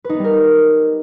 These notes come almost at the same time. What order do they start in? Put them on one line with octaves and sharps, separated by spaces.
B4 D#4 B3 G3 A#4